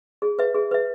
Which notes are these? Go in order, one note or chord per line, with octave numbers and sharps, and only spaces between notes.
G#4
B4 E5
G#4
B4 E5